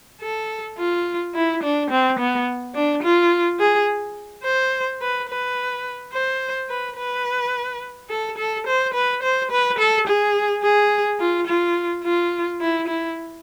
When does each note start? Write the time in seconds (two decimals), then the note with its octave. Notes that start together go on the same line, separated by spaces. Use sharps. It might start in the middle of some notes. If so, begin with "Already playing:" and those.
0.22 A4
0.78 F4
1.35 E4
1.63 D4
1.91 C4
2.19 B3
2.75 D4
3.03 F4
3.60 G#4
4.44 C5
5.01 B4
5.29 B4
6.13 C5
6.70 B4
6.97 B4
8.10 A4
8.38 A4
8.67 C5
8.94 B4
9.23 C5
9.51 B4
9.79 A4
10.07 G#4
10.63 G#4
11.20 F4
11.47 F4
12.04 F4
12.61 E4
12.88 E4